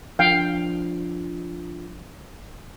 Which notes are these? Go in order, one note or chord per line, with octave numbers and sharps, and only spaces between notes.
F3 D4 F5 G5